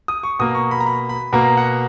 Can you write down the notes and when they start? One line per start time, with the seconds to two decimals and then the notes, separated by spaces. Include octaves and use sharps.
0.08 D#6
0.23 C#6
0.39 B2 A#3 D#6
0.55 C#6
0.71 B5
0.80 A#5
0.86 B5
1.09 B5
1.33 B2 A#3 A#5
1.57 F#5